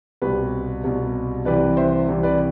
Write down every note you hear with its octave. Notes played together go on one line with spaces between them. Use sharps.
C2 B2 G4 B4
C2 B2
C2 C3 E3 B4 D5
C5 E5
C2 C3 E3
B4 D5